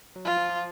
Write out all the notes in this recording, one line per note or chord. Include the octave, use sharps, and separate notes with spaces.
F#3
F3 F4
F3
F3